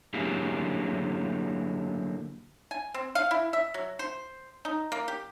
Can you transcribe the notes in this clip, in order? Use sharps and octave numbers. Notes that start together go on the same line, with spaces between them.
D3 F#3 A#3 E4 G4 G#4
G#5
C4
F5
E4
E5
F#3
C5
D#4
A#3
G4